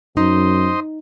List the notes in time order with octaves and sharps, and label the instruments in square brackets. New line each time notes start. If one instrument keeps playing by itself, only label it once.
[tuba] F#2 [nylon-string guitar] D#4 [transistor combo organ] C5 D#5